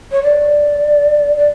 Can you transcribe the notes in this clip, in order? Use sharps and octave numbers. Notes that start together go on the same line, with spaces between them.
C#5
D5
D5